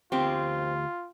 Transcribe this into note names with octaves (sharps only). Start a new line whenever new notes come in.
D2 C4 F4 G4 G5